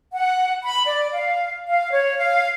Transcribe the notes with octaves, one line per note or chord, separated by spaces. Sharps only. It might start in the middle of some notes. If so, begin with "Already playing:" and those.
F#5
B5
D5
F5
F5
C#5
F5